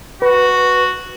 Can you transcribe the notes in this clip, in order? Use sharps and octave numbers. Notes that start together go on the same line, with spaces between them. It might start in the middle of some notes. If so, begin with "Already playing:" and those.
F#4 B4